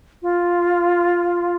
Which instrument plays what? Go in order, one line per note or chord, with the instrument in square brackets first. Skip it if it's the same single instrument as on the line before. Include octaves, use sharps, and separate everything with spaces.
[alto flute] F4